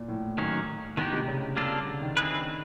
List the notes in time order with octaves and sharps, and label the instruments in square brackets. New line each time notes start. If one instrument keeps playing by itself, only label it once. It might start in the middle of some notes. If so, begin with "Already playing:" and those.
Already playing: [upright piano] A#2
A2
[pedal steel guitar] D#3 F#3 A#3 C#4
[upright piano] A2 [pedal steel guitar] D#3 G#3 B3 D#4 G4
[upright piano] C3
C#3
[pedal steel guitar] G3 A#3 D4 F4 A4
[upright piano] D3
D#3
[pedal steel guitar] C4 E4 G#4 B4